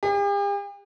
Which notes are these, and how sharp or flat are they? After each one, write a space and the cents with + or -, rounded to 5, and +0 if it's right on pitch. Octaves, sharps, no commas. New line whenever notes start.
G4 +45